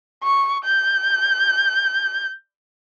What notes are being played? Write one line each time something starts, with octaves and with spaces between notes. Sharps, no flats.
C#6
G6